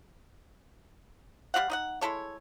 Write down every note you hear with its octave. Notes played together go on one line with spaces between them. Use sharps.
G3 F#4 F5 F#5
D#4 D#5 F#5
G#3 E4 A4 C#5